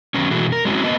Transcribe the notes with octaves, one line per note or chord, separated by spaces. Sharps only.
D#3 F#3 B3 C#4
B2 E3 G#3 A3 E4 F#4
A#4
G#3 C4 C#4 E4 F#4
A#3 B3 D#5